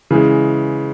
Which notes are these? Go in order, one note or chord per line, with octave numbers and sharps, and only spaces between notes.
C#3 E3 G#3